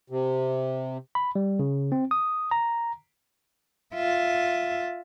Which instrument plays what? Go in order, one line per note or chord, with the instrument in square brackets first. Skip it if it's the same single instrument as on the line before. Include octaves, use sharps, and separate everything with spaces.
[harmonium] C3
[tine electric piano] B5
G3
C#3
C4
D#6
A#5
[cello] F4 E5